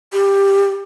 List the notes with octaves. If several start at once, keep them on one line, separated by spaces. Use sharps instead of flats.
G4